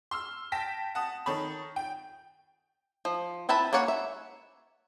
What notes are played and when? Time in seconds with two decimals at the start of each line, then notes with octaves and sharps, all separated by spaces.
0.11 C6 E6 F6
0.52 G5 A5 A#6 B6
0.95 F#5 A5 D#6
1.26 D#3 A4 C#5 B5
1.76 G5
3.05 F3
3.49 C4 E4 B4 A5 B5
3.73 A#3 C#4 C#5 F#5
3.88 E5